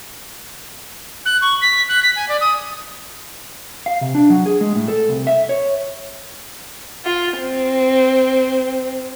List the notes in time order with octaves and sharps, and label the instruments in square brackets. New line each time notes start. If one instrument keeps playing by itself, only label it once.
[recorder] F#6
C#6
B6
F#6
B6
G#5
D5
D#6
[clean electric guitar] F5
C3
D4
F#3
G#4
G#3
A2
A4
C2
E5
C#5
[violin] F4
C4